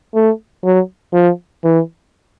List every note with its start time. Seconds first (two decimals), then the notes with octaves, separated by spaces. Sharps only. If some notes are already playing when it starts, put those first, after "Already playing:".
0.15 A3
0.64 F#3
1.13 F3
1.64 E3